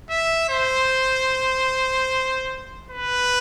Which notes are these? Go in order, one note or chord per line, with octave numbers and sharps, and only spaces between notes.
E5
C5
B4